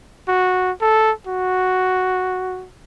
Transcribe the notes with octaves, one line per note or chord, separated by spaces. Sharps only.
F#4
A4
F#4